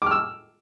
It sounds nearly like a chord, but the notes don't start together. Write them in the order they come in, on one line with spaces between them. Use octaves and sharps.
D6 F6 E6